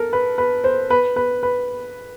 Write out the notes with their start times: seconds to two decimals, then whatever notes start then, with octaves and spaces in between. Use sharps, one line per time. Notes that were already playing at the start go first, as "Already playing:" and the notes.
Already playing: A4 A#4
0.13 B4
0.38 B4
0.64 C5
0.90 B4
1.16 B4
1.43 B4